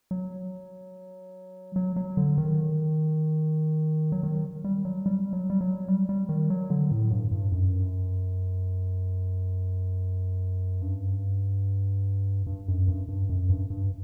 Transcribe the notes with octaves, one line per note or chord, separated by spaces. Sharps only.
F#3
F#3
F#3
D3
D#3
F#3
D#3
G3
F#3
G3
F#3
G3
F#3
G3
G3
D#3
F#3
D3
A2
G2
G2
F#2
G2
G2
F#2
G2
G2
F#2
G2
G2